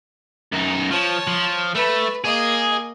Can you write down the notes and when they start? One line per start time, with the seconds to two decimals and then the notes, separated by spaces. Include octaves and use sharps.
0.53 F#2 D#4
0.91 F3 C#5 A5
1.27 F3
1.75 A3 B4
2.24 A#3 G#4 D#5